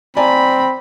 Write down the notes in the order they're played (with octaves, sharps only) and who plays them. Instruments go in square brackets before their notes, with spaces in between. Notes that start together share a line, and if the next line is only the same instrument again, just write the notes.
[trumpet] C4 [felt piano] D5 G#5 A#5 [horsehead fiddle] B5